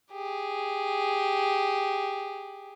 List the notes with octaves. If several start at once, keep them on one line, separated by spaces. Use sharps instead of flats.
G4 G#4